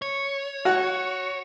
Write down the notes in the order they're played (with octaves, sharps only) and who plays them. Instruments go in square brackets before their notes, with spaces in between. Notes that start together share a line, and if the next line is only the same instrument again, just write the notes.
[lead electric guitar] C#5
[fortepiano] F#4 F#5